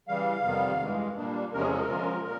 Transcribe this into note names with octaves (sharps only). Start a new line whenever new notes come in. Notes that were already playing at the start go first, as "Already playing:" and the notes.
C#3 E3 G3 F5
F2 C3 D#3 G3 B3
G2 E3 G#3
A#2 G3 A#3 D4
E2 C3 F3 G#3 C#4 A#4
G#4
A4
A#4
D3 F3 G#3 C#4 F4
A#2 A#4